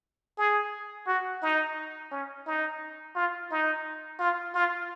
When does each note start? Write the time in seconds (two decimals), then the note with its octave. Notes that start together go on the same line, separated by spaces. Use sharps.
0.38 G#4
1.07 F#4
1.42 D#4
2.11 C#4
2.46 D#4
3.15 F4
3.51 D#4
4.19 F4
4.55 F4